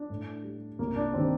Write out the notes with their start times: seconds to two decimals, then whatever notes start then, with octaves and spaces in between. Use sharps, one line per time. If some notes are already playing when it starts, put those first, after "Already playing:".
Already playing: D4
0.10 A2
0.44 G3
0.79 C2 A#3
0.96 D4
1.13 C3 D#3 G3 C4